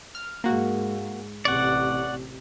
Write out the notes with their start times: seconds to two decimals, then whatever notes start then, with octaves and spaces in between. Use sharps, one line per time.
0.15 F6
0.44 G#2 A#3 F#4
1.45 A1 C3 D5 F#5 C#6